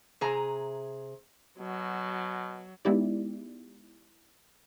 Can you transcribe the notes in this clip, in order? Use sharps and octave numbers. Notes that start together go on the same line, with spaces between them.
C3 G#4 A#5
B2 F#3
G#3 B3 D#4 E4 G4 D5